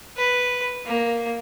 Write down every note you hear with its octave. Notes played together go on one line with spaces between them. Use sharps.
B4
A#3